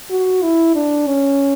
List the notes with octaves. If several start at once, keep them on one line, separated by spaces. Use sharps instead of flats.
F#4
E4
D4
C#4